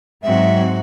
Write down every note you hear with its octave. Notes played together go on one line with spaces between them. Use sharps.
G#2 F#3 C4 F#4 E5